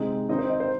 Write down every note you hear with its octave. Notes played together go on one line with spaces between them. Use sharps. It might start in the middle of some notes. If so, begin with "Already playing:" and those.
Already playing: C3 G#3 C4 D#4
D#3 C4 D#4 D#5
C5
D#5
C5